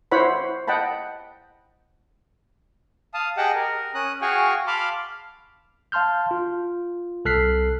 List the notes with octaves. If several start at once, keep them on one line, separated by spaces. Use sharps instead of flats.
E4 C5 C#5 F#5 B5
D#5 F#5 G5 A5 B5
F5 A5 D#6
G4 G#4 D#5 F#5 G5 A5
A#4
C#4 D#6 F#6
F#4 G#4 F5 G5 G#5 C#6
F5 A5 B5 C6 D6 F6
F5 A5 C6 F6 G6
F4
C2 A4 F6 F#6 B6 C7